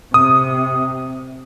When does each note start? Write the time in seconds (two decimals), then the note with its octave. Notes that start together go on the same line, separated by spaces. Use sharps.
0.14 C3 D#6